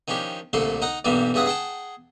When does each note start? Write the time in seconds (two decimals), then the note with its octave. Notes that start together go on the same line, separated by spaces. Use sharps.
0.08 D#3 F3 C#4 D4 G4
0.53 C2 A#2 D3 A3 A4 C6
0.82 D#4 F#5 A#5
1.05 B1 G2 E3 G3 A#3 B3
1.34 G2 C#3 E4 G#4 F#5 D#6
1.46 G#4 F#5 G5 A5